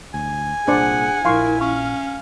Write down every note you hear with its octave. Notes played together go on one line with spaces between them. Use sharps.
D2 G#5
C2 A#2 D4 G#4 C5 D5 F#5
A#1 F3 E4 A#4 F5 C6 C#6
C#4 F5 C#6